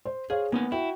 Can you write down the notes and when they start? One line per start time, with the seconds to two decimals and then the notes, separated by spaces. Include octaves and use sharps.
0.05 C5
0.30 G#4 C5 C#5 F5
0.52 A#3 B3 D#4 G#5
0.72 E4 F#4 G5